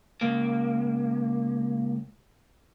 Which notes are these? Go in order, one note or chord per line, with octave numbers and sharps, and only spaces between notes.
C#2 A#3